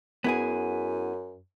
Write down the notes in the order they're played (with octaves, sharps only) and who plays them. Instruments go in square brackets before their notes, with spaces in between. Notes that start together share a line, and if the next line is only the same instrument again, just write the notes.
[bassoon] F#2 [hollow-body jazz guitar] B3 E4 G#4